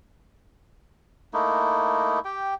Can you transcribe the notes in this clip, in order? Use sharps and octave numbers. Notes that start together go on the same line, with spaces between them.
A3 A#3 D#4 E4
G4 G5